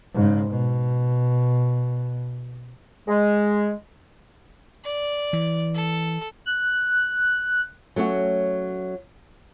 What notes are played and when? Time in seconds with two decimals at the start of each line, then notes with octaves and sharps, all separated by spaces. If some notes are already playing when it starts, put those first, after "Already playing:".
0.14 G#2 C#3
0.49 B2
3.08 G#3
4.84 D5
5.33 E3
5.75 A4
6.46 F#6
7.96 F#3 A3 C#4 F#4